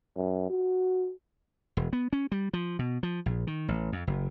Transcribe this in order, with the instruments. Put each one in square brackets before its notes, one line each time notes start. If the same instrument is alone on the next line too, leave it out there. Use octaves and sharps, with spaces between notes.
[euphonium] F#2
F#4
[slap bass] E1
B3
C#4
G3
F3
B2
F3
A#1
D#3
A1
F2
F#1